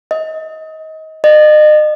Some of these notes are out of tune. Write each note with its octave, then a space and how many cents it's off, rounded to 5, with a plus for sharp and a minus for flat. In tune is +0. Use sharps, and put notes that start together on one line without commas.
D#5 +25
D#5 -40